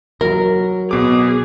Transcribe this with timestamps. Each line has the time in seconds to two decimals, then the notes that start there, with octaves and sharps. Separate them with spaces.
0.21 F#3 A#4
0.91 B2 G#4 D6